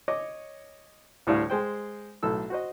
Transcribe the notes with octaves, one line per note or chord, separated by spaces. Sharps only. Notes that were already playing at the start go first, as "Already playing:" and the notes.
C#5 D#5 D6
D2 A2 G3 E4 F5
G#3 C5 G5
B1 A2 A4 E6
F#4 C5 D#5